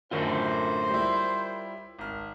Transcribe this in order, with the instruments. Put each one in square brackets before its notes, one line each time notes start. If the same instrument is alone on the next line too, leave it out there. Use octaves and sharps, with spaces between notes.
[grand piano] F#2 A2 D3 [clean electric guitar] F4 A#4 C#5 [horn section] C5
[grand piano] G3 E4
G#1 F6